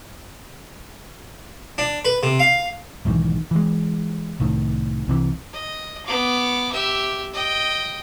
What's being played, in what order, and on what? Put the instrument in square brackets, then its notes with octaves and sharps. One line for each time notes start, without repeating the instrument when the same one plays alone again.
[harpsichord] D4
B4
C3
F5
[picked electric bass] B1 G#2 D#3 E3
E3 G#3
C2 A2 D#3
C2 C3 E3
[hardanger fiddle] D#5
B3 D6
G4 E5
D#5 G5